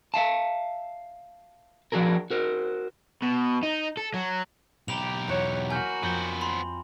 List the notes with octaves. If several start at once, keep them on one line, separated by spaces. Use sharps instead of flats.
E5 F5 A5
F3 D4 F#4 G#4 A#4
F#4 A#4 C5
B2
D#4
A4
F#3
B1 G4 A#5 B5 F7
E2 C#5 F#5 E7
A#3 F#4 G#5 B5 F6 G6
F2 B3 C4 C5 G6
B5 C6